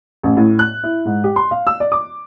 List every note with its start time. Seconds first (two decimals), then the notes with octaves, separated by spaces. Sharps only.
0.23 A1
0.37 A2
0.59 F#6
0.83 E4
1.05 G#2
1.24 G4
1.36 C6
1.51 F5
1.67 E6
1.80 D5
1.92 D6